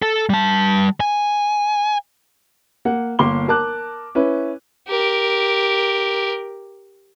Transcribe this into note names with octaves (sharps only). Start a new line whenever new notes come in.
A4
G3 A5
G#5
A#3 F#5
G1 A#3 A#4 C6 D6 G7
A#4 A5 D6 F#6
C#4 E4 B4
G4 A#4